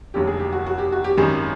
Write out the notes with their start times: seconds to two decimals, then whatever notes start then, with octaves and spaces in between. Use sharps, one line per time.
0.14 F1 D#2 D3 F#3 G4
0.28 G#4
0.40 G4
0.52 F#4
0.66 F#4
0.78 G4
0.92 F#4
1.04 G4
1.17 G#1 F#2 D#3 G3 G#4